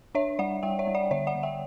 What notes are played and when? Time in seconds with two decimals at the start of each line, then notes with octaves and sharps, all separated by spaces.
0.15 D4 C#5 E5
0.39 G3 D5 F#5
0.63 G3 E5 G5
0.79 C#5 E5
0.87 G3
0.95 D5 F#5
1.11 D3 C#5 E5
1.27 D5 F#5
1.35 D3
1.43 E5 G5